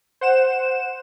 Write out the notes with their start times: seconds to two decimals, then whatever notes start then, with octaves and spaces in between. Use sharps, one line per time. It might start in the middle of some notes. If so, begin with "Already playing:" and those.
0.21 C5 F#5 E7